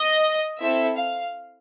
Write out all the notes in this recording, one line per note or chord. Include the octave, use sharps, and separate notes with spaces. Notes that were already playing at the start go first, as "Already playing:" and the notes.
Already playing: D#5
C4 E4 A4 E5
F5